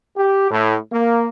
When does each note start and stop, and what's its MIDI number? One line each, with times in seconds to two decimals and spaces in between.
0.17 0.51 67
0.51 0.77 45
0.92 1.29 58